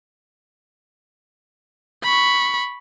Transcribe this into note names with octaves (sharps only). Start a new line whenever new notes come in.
B5 C#6